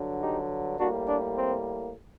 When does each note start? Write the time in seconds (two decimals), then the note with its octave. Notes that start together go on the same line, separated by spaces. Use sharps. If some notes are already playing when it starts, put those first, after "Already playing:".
Already playing: G2 D3 F#3
0.20 D#4 G4
0.78 A2 G3 A#3 D4 F#4
1.07 D4
1.36 C4